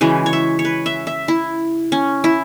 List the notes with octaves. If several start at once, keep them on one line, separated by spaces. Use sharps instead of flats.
C#3 E3 G#3 F#4
C#5
E5
C#5
B4
E5
E5
E4
C#4
E4